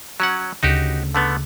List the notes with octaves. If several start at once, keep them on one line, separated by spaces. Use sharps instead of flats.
F#3 C#4 F#5
D2 C#3 D#4 F#4 G4
D3 A3 B3